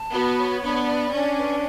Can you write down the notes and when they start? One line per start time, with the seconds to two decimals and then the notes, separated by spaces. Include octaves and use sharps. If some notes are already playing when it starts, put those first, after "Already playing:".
Already playing: A5
0.12 B3 F#4
0.37 C#5
0.62 B3 D4
0.87 D5
1.12 C#4 D4
1.38 B4